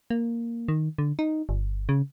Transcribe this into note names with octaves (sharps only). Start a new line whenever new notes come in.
A#3
D#3
D3
D#4
G1
C#3